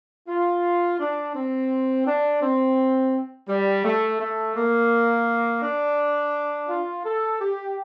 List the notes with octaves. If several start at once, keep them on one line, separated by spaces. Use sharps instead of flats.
F4
D4
C4
D4
C4
G3
A3
A3
A#3
D4
F4
A4
G4